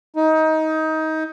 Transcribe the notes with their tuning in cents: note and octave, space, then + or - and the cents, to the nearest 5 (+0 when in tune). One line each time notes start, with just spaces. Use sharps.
D#4 +20